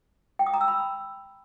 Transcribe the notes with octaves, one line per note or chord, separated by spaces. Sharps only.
G5
D#6
A#5
E6
B5